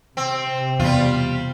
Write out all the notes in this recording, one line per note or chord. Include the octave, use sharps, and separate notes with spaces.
C3 C4
E2 B2 G3 F4